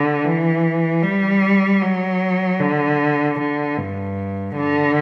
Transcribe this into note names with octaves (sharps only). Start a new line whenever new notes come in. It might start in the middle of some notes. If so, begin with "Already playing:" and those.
Already playing: D3
E3
G3
F#3
D3
D3
G2
D3